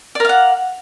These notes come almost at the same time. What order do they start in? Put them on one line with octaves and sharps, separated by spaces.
D5 A#4 F5 F#5